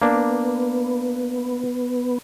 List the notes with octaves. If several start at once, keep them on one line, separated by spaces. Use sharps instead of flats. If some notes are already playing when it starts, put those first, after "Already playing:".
A#3 B3 D4